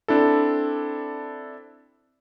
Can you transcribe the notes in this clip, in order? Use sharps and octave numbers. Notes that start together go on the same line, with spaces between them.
C4 D4 E4 A4